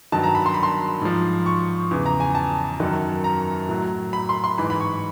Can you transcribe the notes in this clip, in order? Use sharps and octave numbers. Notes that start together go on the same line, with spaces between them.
G2 D#3 F#3 A5
A#5
B5
C6
B5
C6
G#2 F3
C#6
E2 C#3 E3
A#5
G#5
A5
F#2 D#3 F#3
A#5
A2 F#3
B5
C6
C6
G#2 E3 B5
B5
C#6